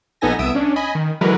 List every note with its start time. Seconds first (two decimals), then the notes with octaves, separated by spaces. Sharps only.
0.21 A#1 B3 D#4 A4 G#5 A#6
0.38 C2 B3 E5 D#6 E6 D7
0.55 C#4 D4
0.76 D#5 G#5 B5
0.95 D#3
1.21 D3 E3 F#3 G#3 A#4 B4